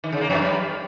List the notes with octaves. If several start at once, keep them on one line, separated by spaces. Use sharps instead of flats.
D#3
C#3
A#3
F2
G3